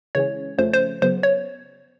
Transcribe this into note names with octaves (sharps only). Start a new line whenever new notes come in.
C#3 E3 G#3 C#4 C#5
F2 C#3 F3 A3 C#4 C5
C5
F#2 C#3 F#3 B3 C5
C#5